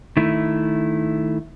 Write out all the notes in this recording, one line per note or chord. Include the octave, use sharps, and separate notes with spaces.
D#3 A3 E4